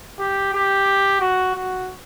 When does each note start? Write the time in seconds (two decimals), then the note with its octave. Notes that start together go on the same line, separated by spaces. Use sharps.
0.19 G4
0.54 G4
1.20 F#4
1.55 F#4